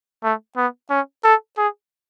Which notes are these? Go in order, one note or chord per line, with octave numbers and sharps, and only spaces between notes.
A3
B3
C#4
A4
G#4